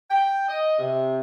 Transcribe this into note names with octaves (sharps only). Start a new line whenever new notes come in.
G5
D#5
C3